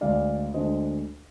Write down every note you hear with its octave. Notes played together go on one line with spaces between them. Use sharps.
D2 D3 G#3 D4 D5 F5
D2 D3 G#3 D4 C5 D#5